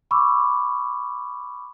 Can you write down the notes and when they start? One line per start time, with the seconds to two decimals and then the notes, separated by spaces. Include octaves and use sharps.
0.11 B5 C#6 D6 E6